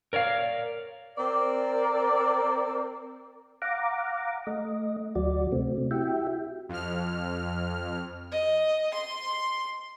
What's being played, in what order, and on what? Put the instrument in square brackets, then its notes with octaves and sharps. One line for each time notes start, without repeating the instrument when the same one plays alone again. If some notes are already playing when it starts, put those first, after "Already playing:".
[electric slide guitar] A#4 C#5 D5 F5
[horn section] C4 A#4 D5
[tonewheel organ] F5 F#5 A#5 D6
A3 D#5
D2 F#3 F#4 D5
C3 A3 C4
E4 F#4 G4 E5 G5
[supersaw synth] F2 F6
[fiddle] D#5
C6